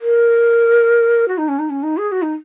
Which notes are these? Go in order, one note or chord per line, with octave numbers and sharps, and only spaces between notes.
A#4
F#4
D#4
C#4
D#4
C#4
D#4
G#4
F#4
D#4